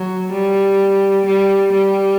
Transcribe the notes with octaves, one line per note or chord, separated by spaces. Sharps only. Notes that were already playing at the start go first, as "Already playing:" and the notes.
Already playing: F#3
G3
G3
G3